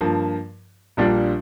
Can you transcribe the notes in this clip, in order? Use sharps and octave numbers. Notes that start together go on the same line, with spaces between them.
G2 F3 A#3
A#1 A#2 G3 D4 F4